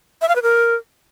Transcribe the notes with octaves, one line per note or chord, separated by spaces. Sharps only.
E5
F5
B4
A#4